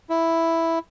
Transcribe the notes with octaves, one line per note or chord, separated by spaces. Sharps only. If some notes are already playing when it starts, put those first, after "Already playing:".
E4